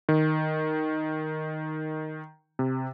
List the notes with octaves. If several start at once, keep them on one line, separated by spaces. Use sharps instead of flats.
D#3
C3